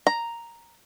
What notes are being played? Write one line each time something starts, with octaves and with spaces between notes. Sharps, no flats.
A#5